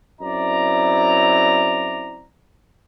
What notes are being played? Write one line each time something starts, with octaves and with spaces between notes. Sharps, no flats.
F#2 C4 E4 D5 A#5